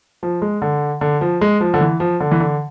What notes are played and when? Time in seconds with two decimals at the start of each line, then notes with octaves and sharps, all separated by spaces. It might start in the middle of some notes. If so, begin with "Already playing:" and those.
0.23 F3
0.42 G#3
0.62 D3
1.01 D3
1.21 F3
1.41 G#3
1.61 F3
1.74 D3
1.81 E3
2.00 F3
2.20 D3
2.31 E3
2.40 D3